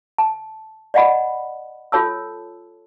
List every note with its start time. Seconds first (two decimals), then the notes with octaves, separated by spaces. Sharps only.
0.18 A5
0.94 D5 D#5 F#5 G#5 B5
1.92 F4 A4 C#5 A5 E6